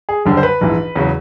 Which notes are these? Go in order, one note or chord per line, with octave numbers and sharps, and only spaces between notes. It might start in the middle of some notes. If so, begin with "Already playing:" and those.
G#4
F#1 F#2 D3 G3
C5
B4
A#1 G#2 E3
E2 C#3 F#3